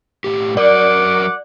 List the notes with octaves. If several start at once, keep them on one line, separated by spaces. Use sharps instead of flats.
A2 G4
F#3 A#4 D5 F#5 D6